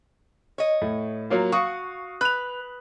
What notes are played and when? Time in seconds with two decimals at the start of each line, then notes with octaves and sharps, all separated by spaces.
0.58 C#5 D#5
0.82 A2
1.30 F#3 A#3 F4
1.52 F#4 F5 C#6 D#6
2.21 B4 F#6 F7